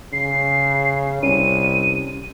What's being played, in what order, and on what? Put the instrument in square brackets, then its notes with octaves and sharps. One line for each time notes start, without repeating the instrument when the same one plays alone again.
[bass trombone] C#3 [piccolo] C7
[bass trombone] C2 [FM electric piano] C#4 [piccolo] D#7